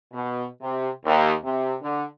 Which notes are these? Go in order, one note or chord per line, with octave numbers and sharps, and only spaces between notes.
B2
C3
D#2
C3
D3